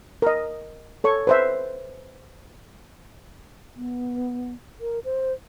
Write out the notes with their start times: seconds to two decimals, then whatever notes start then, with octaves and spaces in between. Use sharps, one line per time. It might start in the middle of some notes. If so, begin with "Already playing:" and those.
0.22 A#4 D#5
1.04 A4 C#5 C#6
1.27 B4 C5 E5
3.76 B3
4.81 A#4
5.05 C5